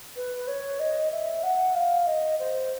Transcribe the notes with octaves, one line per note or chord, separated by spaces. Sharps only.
B4
C#5
D#5
E5
F#5
F5
D#5
C5